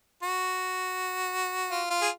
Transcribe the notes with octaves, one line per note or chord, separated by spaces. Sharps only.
F#4
F4
F4
G#4